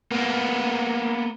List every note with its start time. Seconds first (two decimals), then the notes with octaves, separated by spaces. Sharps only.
0.11 A#3 B3